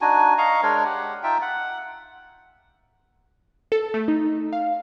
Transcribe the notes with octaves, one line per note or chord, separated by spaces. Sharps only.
D4 D#4 F#4 G#5
D#5 F5 A#5 C#6
G#3 D4 A#4 C#5
G4 F#5
D#4 F4 E5 G5
F#5
A4
A3
D#4
F5